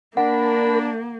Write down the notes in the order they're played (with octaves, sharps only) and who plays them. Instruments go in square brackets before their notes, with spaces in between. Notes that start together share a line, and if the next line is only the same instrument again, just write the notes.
[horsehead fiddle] A#3 [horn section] D4 [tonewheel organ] A#4 B5 [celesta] F#5